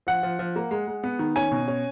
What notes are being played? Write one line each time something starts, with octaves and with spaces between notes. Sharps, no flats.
F3 F#5
F3
F3
A#3
G#3
G#3
B3
D#3
C#4 G#5
B2
C#4